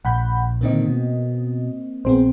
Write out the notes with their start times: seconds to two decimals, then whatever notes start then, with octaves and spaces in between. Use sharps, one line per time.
0.05 A#1 F#5 B5 G6
0.61 A#2 D3 D#3 A#3 C4 D#5
0.86 B2
2.05 A#1 B3 C4 G#4 C5